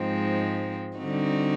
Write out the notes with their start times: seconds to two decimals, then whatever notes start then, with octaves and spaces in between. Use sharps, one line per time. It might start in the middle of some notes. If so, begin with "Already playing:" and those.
Already playing: G#2 F3 G#3 C4 D#4
0.97 D3 G3 C4 D#4 F#4